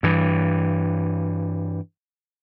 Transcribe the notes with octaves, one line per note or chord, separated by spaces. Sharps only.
G2 E3